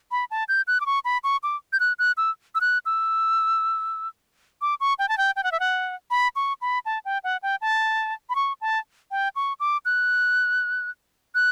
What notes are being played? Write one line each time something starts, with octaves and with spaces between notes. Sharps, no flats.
B5
A5
G6
F#6
D6
C#6
B5
C#6
D6
G6
F#6
F#6
E6
E6
F#6
E6
D6
C#6
G5
A5
G5
G5
F#5
E5
F#5
B5
C#6
B5
A5
G5
F#5
G5
A5
B5
C#6
A5
G5
C#6
D6
F#6
F#6